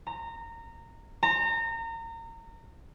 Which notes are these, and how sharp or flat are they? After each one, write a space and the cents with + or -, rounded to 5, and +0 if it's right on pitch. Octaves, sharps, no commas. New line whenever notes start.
A#5 -20
A#5 -30